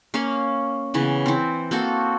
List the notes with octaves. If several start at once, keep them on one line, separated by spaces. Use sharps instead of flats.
A#3 C#4 F5
C#3 E3 B3
E3 C4
A#3 C4 F#4 A4